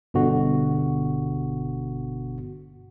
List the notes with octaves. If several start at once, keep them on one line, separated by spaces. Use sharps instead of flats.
G1 B2 D3 F#4